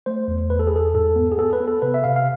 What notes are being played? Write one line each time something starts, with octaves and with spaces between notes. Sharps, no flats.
A3 C5
E2
E2 B4
A4
G#4
E2 A4
G#2 A4
B3
G#4
B3 A4
B4
B3
A4
C3 B4
E5
C3 F5
F5